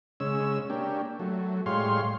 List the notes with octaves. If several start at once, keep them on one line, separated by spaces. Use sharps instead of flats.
C#3 G#3 C#4 E6
A#3 C#4 D4 G4
F#3 A3
A2 G3 G#3 C#5 F5 C6